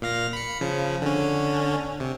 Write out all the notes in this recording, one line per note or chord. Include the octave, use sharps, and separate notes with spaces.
A#2 F5 A#6
B5 C#7
C#3 F3
D3 C#4
C3